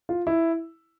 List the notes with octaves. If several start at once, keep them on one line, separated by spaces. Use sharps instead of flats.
F4
E4